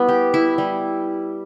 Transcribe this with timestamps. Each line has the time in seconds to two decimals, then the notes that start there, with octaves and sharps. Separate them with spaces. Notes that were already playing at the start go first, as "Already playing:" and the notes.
Already playing: G3 B3 E4
0.09 G4
0.34 E4
0.58 G3